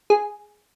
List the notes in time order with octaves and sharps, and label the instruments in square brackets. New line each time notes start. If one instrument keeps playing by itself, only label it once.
[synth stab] G#4